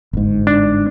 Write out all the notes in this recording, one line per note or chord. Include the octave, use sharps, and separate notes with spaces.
G1 G#2
D4